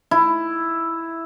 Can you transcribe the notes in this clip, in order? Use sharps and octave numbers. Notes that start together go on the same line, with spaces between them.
E4